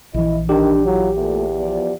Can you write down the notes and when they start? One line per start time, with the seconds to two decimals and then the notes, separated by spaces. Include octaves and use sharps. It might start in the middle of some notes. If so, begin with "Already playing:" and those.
0.14 A#1 E3 E4 D#5
0.49 D#3 D4 G4
0.86 F#3 E4 F4
1.16 E2 A#2 A3
1.56 F3 B3 D5